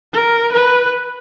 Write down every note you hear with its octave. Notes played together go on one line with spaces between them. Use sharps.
A#4
B4